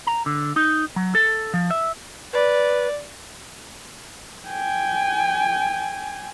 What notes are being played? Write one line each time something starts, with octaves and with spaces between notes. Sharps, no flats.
A#5
D3
D#4
F#3
A4
F3
E5
B4 D5
G5 G#5